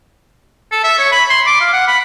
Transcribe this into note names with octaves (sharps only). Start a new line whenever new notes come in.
A4
E5
C#5
B5
C6
D6
F5
F#5
B5